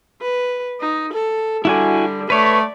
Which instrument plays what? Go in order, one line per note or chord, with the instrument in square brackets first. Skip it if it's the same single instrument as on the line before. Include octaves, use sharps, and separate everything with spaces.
[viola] B4
D#4
A4
[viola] D3 G3 [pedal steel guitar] E4 F#4 G#5
[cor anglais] A3 [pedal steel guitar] B4 C#5 [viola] D5